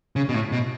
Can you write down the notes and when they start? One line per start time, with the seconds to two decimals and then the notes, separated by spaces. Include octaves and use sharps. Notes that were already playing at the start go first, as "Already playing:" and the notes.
0.16 C#3
0.29 B2
0.34 A2
0.52 B2